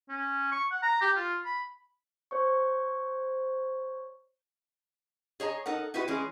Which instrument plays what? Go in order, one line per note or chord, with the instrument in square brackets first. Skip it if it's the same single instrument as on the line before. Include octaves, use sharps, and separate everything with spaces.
[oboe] C#4
C#6
F#5
A#5
G4
F4
B5
[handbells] C5 C#5 C#6
[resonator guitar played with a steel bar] G#4 C#5 D#5 A#5
D#4 A4 A#4 F#5
D#4 E4 F#4 G4 B4
E3 G#3 C#4 G#4